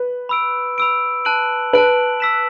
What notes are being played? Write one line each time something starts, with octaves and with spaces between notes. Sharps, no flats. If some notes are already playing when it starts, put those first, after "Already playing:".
Already playing: B4
B5 E6 D7
B5 E6 D7
A5 F#6 D7 F#7
B4 A5 F#6 D7 F#7
E6 B6 E7